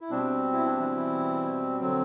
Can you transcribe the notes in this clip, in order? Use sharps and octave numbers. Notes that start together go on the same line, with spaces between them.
E4
B2 G3 C4 D4
E4
D4
E3 E4
E3 E4
D3 F#3 C4